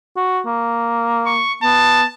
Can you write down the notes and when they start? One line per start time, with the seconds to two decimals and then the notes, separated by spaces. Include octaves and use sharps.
0.17 F#4
0.46 A#3
1.27 C#6
1.63 B3 A5